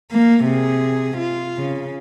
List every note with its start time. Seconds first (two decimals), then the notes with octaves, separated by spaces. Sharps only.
0.12 A#3
0.44 C3 G#4
1.17 F4
1.57 C#3